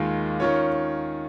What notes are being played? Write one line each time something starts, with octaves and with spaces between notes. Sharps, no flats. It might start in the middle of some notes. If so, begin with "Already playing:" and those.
Already playing: D#2 D#3 G#3 F4
D#3 C#4 F4 C#5